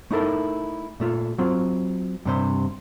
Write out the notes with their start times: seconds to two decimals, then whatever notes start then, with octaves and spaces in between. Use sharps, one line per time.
0.11 A3 D#4 E4 A4 A#4
1.00 A#2 A3 F4
1.38 F#3 C4 F4
2.25 G2 C3 C5